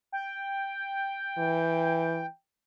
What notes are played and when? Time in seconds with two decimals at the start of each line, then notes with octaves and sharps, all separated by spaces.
0.12 G5
1.38 E3